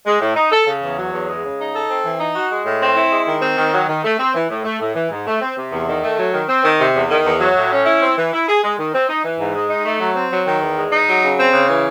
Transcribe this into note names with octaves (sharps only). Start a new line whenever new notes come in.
G#3
A2
D#4
A4
C#3
E2
F#3
E2
G#3
C#3
D#4
A4
C4
E3
D#4
F#4
G#3
A2
C4
E4
G#3
D#3
C4
D#3
F#3
D#3
A3
C4
E3
A2
A3
A2
E3
G#2
A3
C4
C3
E2
D#3
A3
F#3
D#3
C4
D#3
C3
E2
D#3
E2
F#3
A2
C#4
E4
C4
E3
E4
G#4
G#3
D#3
C4
D#4
E3
G#2
G#3
D#4
A3
F#3
C4
F#3
D#3
E2
G#3
D#4
F#3
C#3
C4
C#3
E3